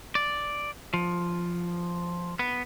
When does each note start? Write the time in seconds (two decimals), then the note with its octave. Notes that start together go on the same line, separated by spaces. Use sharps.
0.15 D5
0.94 F3
2.39 B3